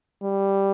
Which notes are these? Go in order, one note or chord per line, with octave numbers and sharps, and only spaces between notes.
G3